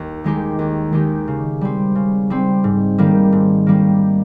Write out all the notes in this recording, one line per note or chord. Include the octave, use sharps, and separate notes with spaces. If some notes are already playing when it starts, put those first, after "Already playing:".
Already playing: D#2
D#3 G#3 D#4 G4
D#2
D#3 G#3 D#4 G4
C#3
G3 C4
C#3
G3 C4
G#2
D#3 G3 A#3
G#2
D#3 G3 A#3